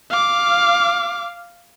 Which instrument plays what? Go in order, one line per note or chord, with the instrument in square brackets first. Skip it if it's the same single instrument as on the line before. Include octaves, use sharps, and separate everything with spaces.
[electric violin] F5 D6